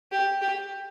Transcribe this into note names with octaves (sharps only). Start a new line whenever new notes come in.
G4
G4